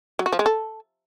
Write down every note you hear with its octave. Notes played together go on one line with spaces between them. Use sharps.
F#3
F#4
F3
G#3
A4